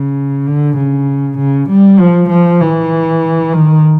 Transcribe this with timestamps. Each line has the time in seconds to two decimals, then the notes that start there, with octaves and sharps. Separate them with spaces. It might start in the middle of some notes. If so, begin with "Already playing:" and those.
Already playing: C#3
0.47 D3
0.77 C#3
1.38 C#3
1.69 G3
1.99 F3
2.30 F3
2.61 E3
3.53 D#3